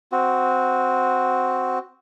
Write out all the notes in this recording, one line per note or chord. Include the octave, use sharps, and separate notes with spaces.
C4 F#4